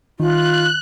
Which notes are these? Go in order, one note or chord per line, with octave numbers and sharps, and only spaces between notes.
D#3 F4 F#6